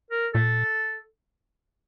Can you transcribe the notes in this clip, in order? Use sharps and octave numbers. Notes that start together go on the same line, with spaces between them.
A#4
A#2 A4